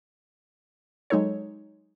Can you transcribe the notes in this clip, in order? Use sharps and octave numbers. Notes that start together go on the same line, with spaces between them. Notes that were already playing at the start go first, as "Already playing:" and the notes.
F#3 G#3 D#4 A4 C#5